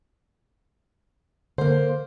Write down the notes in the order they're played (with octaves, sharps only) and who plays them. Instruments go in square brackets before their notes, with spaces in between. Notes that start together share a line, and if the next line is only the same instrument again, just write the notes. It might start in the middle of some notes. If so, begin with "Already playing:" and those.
[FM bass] D3 [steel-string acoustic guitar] A#3 C5